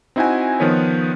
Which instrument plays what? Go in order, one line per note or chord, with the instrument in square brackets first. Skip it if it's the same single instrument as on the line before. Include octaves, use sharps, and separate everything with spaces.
[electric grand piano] C4 D#4 E4 F#4 F#5 G#5
D#3 F3 B3 B4 C#5